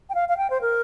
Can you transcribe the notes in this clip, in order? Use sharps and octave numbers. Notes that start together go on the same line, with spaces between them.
G5
F5
F5
G5
C5
A#4